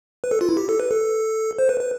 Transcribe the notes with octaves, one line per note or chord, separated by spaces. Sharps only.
B4
A4
F4
E4
G4
A4
B4
A4
C5
B4
B4